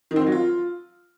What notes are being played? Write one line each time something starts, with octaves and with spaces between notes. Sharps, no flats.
D#3
C4
D#3
F#3
F4